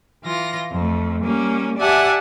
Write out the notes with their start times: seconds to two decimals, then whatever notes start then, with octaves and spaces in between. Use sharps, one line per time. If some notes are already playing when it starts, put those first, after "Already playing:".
0.23 E3 F4 A#6
0.73 F2 A3
1.24 G3 A#3 C#4
1.79 G4 D5 E5 F#5 G#5 A5